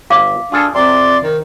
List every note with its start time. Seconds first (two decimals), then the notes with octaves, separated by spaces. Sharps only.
0.10 G1 F5 D6
0.52 D4 F4 G#4 A4
0.75 F2 C3 D5 C6
1.23 D#3